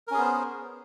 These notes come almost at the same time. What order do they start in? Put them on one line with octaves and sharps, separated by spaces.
A#4 C#4 G#4 B3 C5